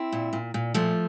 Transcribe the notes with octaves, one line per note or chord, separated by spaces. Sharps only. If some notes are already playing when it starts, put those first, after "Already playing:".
Already playing: C4 E4
A#2
A#2
A#2
A#2 F3 A3